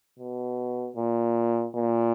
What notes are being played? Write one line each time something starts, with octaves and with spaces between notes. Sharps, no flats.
B2
A#2
A#2